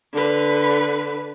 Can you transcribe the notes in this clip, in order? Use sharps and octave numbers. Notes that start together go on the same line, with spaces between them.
D3 B4